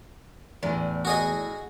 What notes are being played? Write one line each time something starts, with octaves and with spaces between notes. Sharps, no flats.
E2 A2 D4 G#5
F#4 G#4 D#5